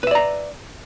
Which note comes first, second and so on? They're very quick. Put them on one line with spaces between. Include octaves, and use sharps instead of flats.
B4 E5 D5 A#5